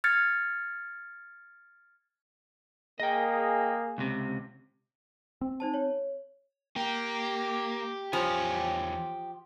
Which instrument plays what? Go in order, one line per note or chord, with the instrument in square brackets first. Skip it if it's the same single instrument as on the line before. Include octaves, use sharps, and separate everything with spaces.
[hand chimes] F6 G#6 A6 C#7
[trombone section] A#3 G#4 [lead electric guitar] D#5 G5
[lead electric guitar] C#2 C3
[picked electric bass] C4
[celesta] D#4 C5 A5
C#5
[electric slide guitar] A#3 [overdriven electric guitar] G4
[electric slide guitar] E2 C#5 G#5 [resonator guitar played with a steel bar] F3